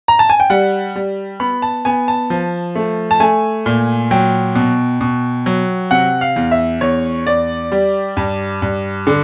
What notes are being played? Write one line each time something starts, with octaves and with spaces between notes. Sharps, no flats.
A#5
A5
G#5
G5
G3 F#5
G3
B3 B5
A5
B3 G#5
A5
F3
A3
A5
A3 G#5
A#2
F#3 G5
B2
B2
F#3
C3 F#5
F5
E2
E5
E2 C#5
E2 D5
G3
G2
G2
D3